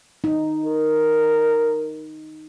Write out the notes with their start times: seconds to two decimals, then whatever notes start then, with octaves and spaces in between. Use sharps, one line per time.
0.24 D#4
0.65 A#4